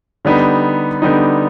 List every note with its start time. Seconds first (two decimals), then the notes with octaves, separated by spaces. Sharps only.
0.25 D3 G3 B3 D#4
1.02 D3 G3 B3 D#4